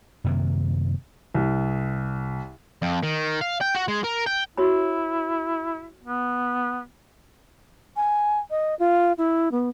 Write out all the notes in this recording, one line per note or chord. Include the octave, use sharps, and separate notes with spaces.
F#2 C3 D#3 A#3
C2
F2
D#3
F5
G5
F#4
G#3
A#4
G5
E4 F#4 C#5 B5
B3
G#5
D#5
F4
E4
B3